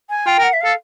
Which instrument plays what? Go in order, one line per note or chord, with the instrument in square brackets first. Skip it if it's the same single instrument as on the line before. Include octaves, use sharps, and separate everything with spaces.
[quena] G#5
[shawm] F4 [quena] G5
[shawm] A#4
[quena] F#5
E5
[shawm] A4 [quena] F5